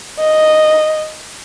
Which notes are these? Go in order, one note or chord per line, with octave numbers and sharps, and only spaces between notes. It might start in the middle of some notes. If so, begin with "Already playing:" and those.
D#5